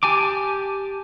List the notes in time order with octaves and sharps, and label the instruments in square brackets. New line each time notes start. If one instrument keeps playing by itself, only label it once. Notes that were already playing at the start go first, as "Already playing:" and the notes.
[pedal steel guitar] G4 G#5 A5 D6